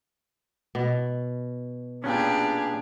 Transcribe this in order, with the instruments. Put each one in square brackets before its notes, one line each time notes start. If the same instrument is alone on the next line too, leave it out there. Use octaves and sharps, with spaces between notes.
[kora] B2
[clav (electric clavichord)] A#2 B3 C#4 [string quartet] D4 G4 G#4